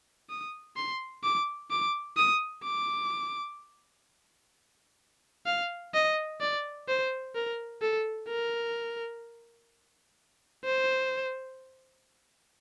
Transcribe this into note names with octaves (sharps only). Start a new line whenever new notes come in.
D#6
C6
D6
D6
D#6
D6
F5
D#5
D5
C5
A#4
A4
A#4
C5